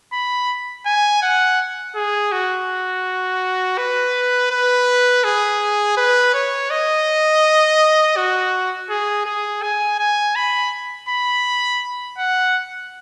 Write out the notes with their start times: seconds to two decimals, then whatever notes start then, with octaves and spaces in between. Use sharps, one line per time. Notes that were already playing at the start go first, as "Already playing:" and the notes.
0.13 B5
0.86 G#5
1.22 F#5
1.95 G#4
2.32 F#4
3.78 B4
4.51 B4
5.24 G#4
5.97 B4
6.34 C#5
6.70 D#5
8.16 F#4
8.90 G#4
9.26 G#4
9.62 G#5
9.99 G#5
10.35 B5
11.09 B5
12.18 F#5